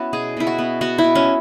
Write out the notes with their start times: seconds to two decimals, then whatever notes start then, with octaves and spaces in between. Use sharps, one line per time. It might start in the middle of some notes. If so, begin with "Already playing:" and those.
Already playing: B3 C#4 E4 F#4
0.13 B2 G#4
0.37 B2 E4
0.47 F#4
0.58 B3
0.81 B3 F#4
0.98 E4
1.04 B2
1.15 C#4